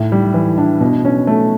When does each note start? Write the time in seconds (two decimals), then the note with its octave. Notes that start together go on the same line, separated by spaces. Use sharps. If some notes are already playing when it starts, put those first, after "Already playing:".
Already playing: A2
0.12 G3
0.34 E3
0.58 D4
0.81 B2
1.05 C#4
1.27 A3